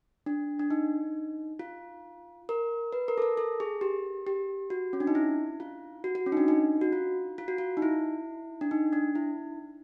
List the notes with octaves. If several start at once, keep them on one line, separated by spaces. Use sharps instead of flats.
D4
D4
D#4
F4
A#4
B4
A#4
A4
A#4
A4
G#4
G4
G4
F#4
C#4
D4
D#4
E4
F4
F#4
F#4
C#4
D#4
D4
D#4
F#4
F4
F4
F#4
F4
D#4
E4
D4
D#4
D4
E4